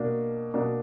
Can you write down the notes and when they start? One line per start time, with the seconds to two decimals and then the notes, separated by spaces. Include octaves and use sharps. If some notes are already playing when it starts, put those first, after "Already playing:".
Already playing: B2 A#3 D4
0.54 B2 A#3 D4